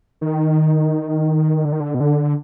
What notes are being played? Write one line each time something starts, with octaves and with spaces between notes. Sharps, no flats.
D#3
D3
D#3
D3
B2
D3